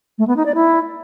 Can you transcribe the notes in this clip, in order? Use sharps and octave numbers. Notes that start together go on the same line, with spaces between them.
A3
B3
D#4
D5
E4